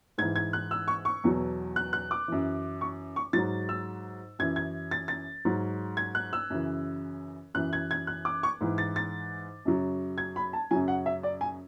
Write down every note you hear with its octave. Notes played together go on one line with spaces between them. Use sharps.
G#2 E3 G#6
G#6
F#6
E6
C#6
C#6
E2 B2 F#3
F#6
F#6
D6
F#2 E3
C#6
C#6
G#2 F#3 A6
E6
F#2 E3 G#6
G#6
A6
A6
G#2 F#3
G#6
F#6
E6
F#2 C#3 E3
F#2 E3 F#6
G#6
G#6
F#6
D6
C#6
G#2 E3
A6
A6
F#2 C#3 F#3
G#6
B5
A5
F#2 C#3 F#3 G#5
F#5
E5
D5
G#5